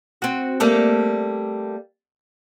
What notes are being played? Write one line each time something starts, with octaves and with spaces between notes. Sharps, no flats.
C4 F#4
G3 A3 A#3